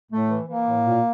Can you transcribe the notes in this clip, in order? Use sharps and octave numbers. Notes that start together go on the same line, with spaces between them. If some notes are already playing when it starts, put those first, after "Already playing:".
A2 A3
E3
E3 A#3
A2
A#2